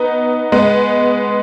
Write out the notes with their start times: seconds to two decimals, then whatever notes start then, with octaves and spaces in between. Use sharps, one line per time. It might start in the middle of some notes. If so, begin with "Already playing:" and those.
Already playing: B3 D#4
0.52 G#3 B3